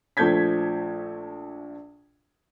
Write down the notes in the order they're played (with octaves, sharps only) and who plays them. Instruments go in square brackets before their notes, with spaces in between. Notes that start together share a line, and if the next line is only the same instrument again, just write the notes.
[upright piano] A#1 F3 A3 G6 G#6 B6